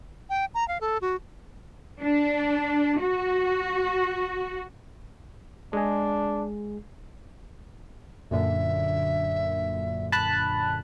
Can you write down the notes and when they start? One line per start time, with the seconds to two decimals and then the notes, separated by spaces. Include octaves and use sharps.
0.30 G5
0.54 A#5
0.68 F5
0.81 A4
1.02 F#4
2.01 D4
3.01 F#4
5.73 G#3 D4 G#4
8.31 F#2 A#2 D3 E5
10.12 A5 B5 F#6